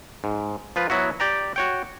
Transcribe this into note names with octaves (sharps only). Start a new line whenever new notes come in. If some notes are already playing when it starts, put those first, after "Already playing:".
G#2
F3 F4 B4
F#3 B3 E4 F#4
G4 D5 G5 A#5
F#4 C#5 G5